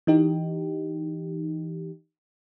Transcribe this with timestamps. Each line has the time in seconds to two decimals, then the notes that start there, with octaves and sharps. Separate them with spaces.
0.07 E3 D#4 G4